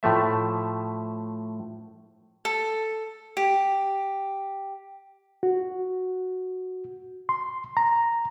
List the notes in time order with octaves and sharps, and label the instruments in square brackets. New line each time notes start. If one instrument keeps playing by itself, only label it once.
[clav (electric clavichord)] A2 F3 A3 E5
[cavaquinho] A4
G4
[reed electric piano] F#4
C6
A#5